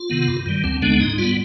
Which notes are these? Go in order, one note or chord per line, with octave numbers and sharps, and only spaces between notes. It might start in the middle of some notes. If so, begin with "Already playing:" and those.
Already playing: F4
C3 D#3 B3
G2
D#3 G3
D2 C4
D3 G#3 B3 D4
G#2 D#4
G3 B3 F4